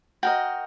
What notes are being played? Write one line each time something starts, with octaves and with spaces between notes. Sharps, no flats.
F#4 A#4 D#5 G5